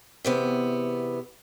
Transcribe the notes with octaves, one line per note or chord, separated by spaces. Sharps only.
E2 C3 B3